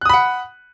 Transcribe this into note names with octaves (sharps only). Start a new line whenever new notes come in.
F#5 B5 D#6 F#6